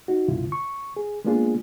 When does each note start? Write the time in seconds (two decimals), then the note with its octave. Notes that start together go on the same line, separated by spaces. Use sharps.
0.08 D#4 F#4
0.28 C2 G2 B2 D3 E4 F4
0.52 C#6
0.97 G#4
1.25 G#3 A#3 B3 D4 F4 G#4